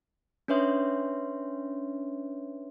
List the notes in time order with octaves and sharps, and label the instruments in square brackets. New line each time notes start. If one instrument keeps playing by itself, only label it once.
[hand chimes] C#4 D4 B4 C#5 E5 C6